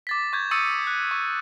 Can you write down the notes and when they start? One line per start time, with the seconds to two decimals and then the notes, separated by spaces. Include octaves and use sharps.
0.07 D6 A6 B6
0.33 C#6 G6 G#6
0.51 C#6 D#6 E6 A6 C#7 D#7
0.87 F#6
1.11 C#6